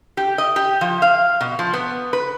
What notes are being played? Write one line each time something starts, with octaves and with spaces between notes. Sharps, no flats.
G4
D#5
G4
F3
F5
B2
F3
B3
B4